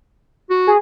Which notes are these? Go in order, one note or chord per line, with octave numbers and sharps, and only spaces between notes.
F#4
G#4